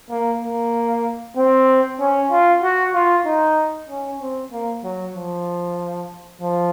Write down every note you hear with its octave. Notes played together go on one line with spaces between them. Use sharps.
A#3
A#3
C4
C#4
F4
F#4
F4
D#4
C#4
C4
A#3
F#3
F3
F3